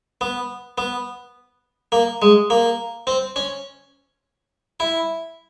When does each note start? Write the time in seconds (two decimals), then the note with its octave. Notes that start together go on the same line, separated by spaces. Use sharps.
0.21 B3
0.78 B3
1.92 A#3
2.22 G#3
2.50 A#3
3.07 C4
3.36 C#4
4.80 E4